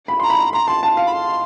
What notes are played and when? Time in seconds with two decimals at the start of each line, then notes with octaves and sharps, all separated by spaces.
0.08 B5
0.20 A#5 C6
0.30 B5
0.53 A#5 C6
0.67 A5 C6
0.83 A5
0.97 F5
1.07 B5
1.13 C6